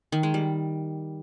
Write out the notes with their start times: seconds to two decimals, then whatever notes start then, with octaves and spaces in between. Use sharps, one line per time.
0.12 D#3
0.23 G#3
0.34 G3